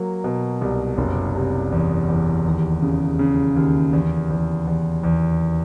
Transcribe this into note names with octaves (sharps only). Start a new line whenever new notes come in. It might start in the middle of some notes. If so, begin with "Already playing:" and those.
Already playing: F#3 A#3
B2
C2
F#1
C3
E2
E2
D#2
C#3
C#3
D#2
E2
E2
E2
E2